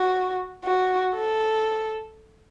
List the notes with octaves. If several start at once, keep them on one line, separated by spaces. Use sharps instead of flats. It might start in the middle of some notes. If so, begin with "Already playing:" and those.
Already playing: F#4
F#4
A4